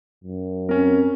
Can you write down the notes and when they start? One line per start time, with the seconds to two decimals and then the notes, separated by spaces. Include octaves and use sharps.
0.25 F#2
0.69 C4 C#4 A#4